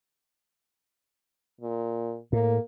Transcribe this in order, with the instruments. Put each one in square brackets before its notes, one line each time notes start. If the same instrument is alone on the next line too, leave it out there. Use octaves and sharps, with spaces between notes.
[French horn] A#2
[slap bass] A2 [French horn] A#3